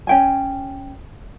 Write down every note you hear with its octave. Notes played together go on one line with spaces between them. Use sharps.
C#4 G5 G#5